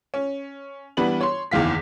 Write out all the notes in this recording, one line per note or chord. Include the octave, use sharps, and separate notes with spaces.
C#4
E3 G3 B3 D4 B4 F#7
C#5 C6
F#1 E2 D#3 E3 F5 B6